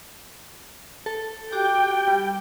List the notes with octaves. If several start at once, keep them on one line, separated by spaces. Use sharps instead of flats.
A4
F#4 G4 G5 D6
G3